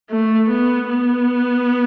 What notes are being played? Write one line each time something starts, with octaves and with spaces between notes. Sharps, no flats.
A3
B3
B3